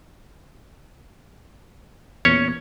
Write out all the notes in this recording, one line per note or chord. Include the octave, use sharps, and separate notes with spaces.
E2 A#2 C#4 C#5